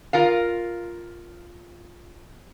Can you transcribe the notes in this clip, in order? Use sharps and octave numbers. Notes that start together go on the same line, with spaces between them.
F4 A#4 F5